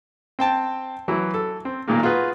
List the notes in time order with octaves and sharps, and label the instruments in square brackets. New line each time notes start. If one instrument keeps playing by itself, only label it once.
[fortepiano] C4 G5 A5
E3 F#3 E4
A4
C4
B1 A#2 D#3 G#3 A#3
F4 F#4 G#4 B4